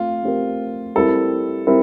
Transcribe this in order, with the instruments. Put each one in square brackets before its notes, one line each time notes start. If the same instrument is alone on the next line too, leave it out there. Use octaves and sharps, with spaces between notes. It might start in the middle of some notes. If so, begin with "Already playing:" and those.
Already playing: [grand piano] A3 C4 [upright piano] F4
[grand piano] A3 C4 G4 A#4
[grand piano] G3 C4 E4 A#4 [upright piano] A4
[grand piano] G3 C4 E4 A#4